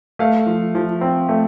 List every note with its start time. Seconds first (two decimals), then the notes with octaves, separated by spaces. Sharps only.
0.19 A3 F5
0.46 F3
0.75 F3
1.01 C4
1.29 A3